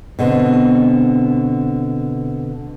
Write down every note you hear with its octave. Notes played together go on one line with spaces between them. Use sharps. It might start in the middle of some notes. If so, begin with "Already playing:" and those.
B2 D3 C4